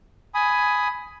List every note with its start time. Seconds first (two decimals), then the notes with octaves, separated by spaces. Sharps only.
0.34 G#5 B5 D#6